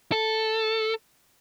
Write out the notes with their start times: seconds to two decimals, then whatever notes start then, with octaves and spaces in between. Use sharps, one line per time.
0.12 A4